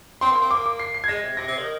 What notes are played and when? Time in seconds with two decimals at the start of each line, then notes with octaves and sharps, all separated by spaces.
0.21 C4 C6
0.31 A#3
0.36 C6
0.42 C4
0.51 A#3 D6
0.66 D6
0.79 C7
0.94 C7
1.04 G#6
1.08 G#3 A#6
1.23 C3
1.37 C3 A#6
1.48 C3
1.58 D#3